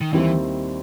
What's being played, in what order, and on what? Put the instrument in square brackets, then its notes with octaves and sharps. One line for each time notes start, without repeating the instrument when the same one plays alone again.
[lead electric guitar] D#3
[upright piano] D#2 D#3 G3 C4 E4 [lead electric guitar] E3